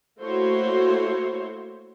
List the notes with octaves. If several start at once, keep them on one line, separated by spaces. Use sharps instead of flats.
A3 A#3 E4 F#4 C5 C#5